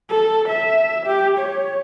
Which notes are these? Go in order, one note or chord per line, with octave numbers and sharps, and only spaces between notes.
A4
E5
G4
C#5